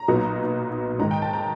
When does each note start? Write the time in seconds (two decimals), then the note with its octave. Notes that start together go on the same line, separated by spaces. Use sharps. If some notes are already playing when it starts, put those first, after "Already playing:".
Already playing: A#5
0.08 B1 A#2 F#3 B3 D#4
0.99 G#2 D#3 G#3 A#5
1.11 G5
1.22 A5
1.33 A#5